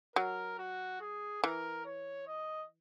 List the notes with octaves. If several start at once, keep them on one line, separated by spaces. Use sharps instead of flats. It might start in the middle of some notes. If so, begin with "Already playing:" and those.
F#3 A#4
F#4
G#4
E3 A#4
C#5
D#5